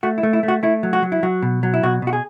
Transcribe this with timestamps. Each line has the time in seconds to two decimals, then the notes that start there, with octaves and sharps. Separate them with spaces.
0.03 A3 F#4
0.18 E4
0.23 A3
0.33 E4
0.43 A3
0.48 F#4
0.63 A3 E4
0.83 F#3
0.93 F#4
1.03 F#3
1.12 E4
1.23 F#3 F#4
1.42 B2
1.63 F#3
1.74 E4
1.83 B2 F#4
2.02 B2 F#4
2.13 G#4